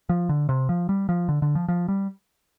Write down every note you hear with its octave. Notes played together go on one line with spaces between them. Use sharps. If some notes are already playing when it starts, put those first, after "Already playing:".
F3
D3
C3
F3
G3
F3
D3
D3
F3
F3
G3